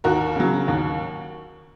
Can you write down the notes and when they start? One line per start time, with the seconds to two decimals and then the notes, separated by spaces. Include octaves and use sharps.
0.04 D#2 F#4 A#4
0.36 C#3 F#3
0.68 D#2